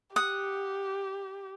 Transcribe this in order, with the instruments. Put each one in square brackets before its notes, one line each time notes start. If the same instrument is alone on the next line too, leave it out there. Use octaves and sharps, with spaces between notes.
[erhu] G4 [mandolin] F#5 [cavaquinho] D#6